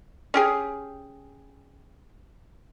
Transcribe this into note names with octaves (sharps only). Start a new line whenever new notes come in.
C#4 G4 G#4